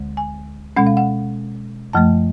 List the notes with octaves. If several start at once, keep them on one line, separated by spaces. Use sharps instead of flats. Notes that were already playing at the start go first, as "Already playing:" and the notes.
Already playing: D2 D3 G#3
G#5
B2 G#3 C#4 F#5
F5
F#5
F#2 F3 A3 A5